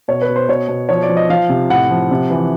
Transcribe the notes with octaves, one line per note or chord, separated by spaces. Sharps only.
B2 C#5
B4
B2
C5
B2 C#5
B2
F3 C#5
D5
F3
D#5
F3 F5
C3
A2 F#5
F3
C3
E3